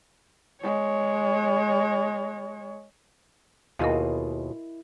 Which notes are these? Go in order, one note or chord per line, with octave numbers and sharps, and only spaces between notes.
G#3 C#5
D#2 B2 E4 F4 G#4 A#4 D#5 F5